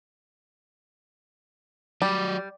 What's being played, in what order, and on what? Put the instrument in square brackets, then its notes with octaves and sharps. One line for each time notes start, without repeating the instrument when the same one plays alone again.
[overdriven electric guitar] F#3 D5 [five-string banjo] G3